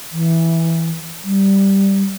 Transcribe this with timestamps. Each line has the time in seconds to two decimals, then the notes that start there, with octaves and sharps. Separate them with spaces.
0.12 E3
1.24 G3